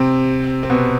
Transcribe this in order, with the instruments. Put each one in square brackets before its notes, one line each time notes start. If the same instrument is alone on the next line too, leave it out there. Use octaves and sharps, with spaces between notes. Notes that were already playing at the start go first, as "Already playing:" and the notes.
Already playing: [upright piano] C3 C4
C4
B2 B3